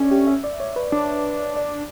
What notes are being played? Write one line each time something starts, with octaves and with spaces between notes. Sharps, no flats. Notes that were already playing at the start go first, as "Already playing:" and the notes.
Already playing: C#4 D4 A4 C#5 D5 E5
G4
E5
D5
C#5
B4
D4
D5